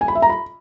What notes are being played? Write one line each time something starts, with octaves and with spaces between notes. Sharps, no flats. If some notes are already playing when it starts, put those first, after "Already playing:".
G#5
B5
E5
A#5
B5